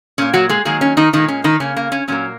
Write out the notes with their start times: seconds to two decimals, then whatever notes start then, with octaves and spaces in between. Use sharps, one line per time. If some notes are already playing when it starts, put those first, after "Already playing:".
0.18 A#2 A#3 C#4
0.33 F#3 F#4
0.49 G#3 G#4
0.65 D#3 F#3 G#3 A#3 G#4
0.81 C#4
0.97 D#3 D#4
1.13 A#2 D#3 G#3 D#4
1.28 C#4
1.44 D#3 D#4
1.60 C#3 A#3 C#4
1.77 A#3
1.92 C#4
2.08 A#2 F#3 A#3 C#4